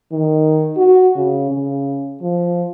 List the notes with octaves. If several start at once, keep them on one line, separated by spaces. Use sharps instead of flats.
D#3
F#4
C#3
C#3
F3